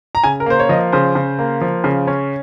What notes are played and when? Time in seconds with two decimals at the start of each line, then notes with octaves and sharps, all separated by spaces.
0.15 A#5
0.24 C#3 G#5
0.40 A#4
0.46 A#3 C5
0.60 C#5
0.69 F3 D#5
0.93 C#3 C5
1.15 C#3
1.39 A#3
1.61 F3
1.84 C#3
2.07 C#4